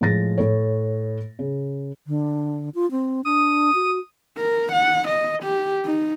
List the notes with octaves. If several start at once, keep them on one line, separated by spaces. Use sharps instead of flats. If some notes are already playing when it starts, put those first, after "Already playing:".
A2 F3 G#3 A6 A#6
A2 A4 C#5
C#3
D3
F4
C4
D4 D#6
F#4
A#4
F#5
D#5
G4
D#4